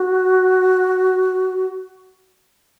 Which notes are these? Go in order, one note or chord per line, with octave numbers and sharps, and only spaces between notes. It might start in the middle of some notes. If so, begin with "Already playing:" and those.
Already playing: F#4